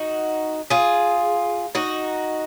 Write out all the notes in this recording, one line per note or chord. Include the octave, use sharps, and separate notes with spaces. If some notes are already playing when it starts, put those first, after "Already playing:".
Already playing: D#4 F#4
F4 G#4
D#4 F#4